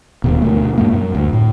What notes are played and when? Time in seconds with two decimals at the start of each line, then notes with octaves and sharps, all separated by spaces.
0.24 D1 D#2 B2
0.42 D2 B2 A3
0.78 G2 G#3 A#3
0.92 F#2
1.15 D2
1.33 A2